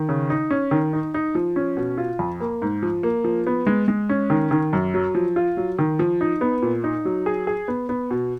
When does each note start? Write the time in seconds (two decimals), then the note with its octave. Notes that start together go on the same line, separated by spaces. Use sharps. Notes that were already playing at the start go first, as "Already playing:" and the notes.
Already playing: D#3
0.09 C#3
0.30 D#4
0.50 C#4
0.71 D#3
0.93 D#4
1.14 D#4
1.35 F3
1.56 C#4
1.77 B2
1.98 F4
2.19 F2
2.40 A#3
2.62 G#2
2.82 F3
3.03 A#3
3.24 F3
3.47 B3
3.67 G#3
3.88 G#3
4.09 C#4
4.30 D#3
4.51 D#3
4.73 F#2
4.94 F#3
5.15 F3
5.36 F4
5.57 F#3
5.79 D#3
5.99 F3
6.21 D#4
6.41 B3
6.62 A#2
6.84 D#4
7.05 F#3
7.26 G#4
7.47 G#4
7.68 B3
7.89 B3
8.10 B2